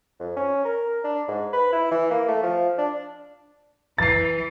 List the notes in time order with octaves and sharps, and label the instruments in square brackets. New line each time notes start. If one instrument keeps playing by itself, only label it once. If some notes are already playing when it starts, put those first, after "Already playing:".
[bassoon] F2
C#4
A#4
D4
G#2
B4
E4
E3
A#3
A3
F3
D4
[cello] E3 [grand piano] A6 C7